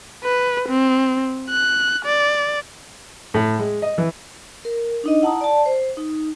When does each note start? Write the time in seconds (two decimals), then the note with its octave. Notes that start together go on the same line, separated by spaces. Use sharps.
0.24 B4
0.69 C4
1.50 F#6
2.05 D5
3.34 A2
3.59 G#3
3.82 D#5
3.98 E3
4.65 A#4
5.04 D4 D#4 D#5
5.22 E4 F#5 A5 A#5 D#6
5.41 D5 A5
5.66 C5
5.97 D#4